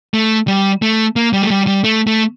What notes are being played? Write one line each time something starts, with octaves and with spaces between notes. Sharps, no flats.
A3
G3
A3
A#3
G3
A3
G3
G3
A3
A3